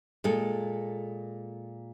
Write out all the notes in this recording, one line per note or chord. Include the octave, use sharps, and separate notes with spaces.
A#2 G#3 A4